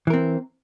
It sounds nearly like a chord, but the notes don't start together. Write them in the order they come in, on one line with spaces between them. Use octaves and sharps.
E3 A#4 C4